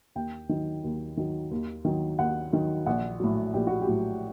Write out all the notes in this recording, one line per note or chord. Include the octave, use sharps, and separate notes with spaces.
D#2 G5
D#3 F#3
D#2
D#3 F#3
D#2
D#3 F#3
D#2 F#5
D#3 F#3
A#1 F#5
A2 F#3
A#1 G4
F#4
G4
A2 F#3